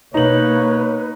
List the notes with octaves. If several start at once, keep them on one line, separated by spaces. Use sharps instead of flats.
B2 A#3 D#4 B4 C#5 F#7